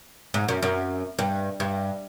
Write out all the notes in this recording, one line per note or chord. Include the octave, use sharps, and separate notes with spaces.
G#2
F#2
F#2
G2
G2